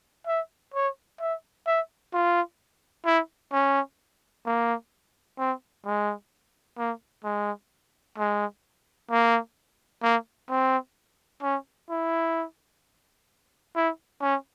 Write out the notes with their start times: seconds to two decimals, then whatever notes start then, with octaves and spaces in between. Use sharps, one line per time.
0.27 E5
0.74 C#5
1.20 E5
1.66 E5
2.13 F4
3.05 E4
3.52 C#4
4.46 A#3
5.38 C4
5.85 G#3
6.78 A#3
7.24 G#3
8.18 G#3
9.11 A#3
10.02 A#3
10.49 C4
11.42 C#4
11.89 E4
13.75 E4
14.21 C#4